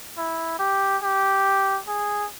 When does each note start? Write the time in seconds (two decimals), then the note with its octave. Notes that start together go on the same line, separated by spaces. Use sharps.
0.17 E4
0.59 G4
1.03 G4
1.88 G#4